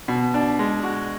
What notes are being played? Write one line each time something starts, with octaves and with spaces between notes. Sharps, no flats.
B2
D4
G#3
F#4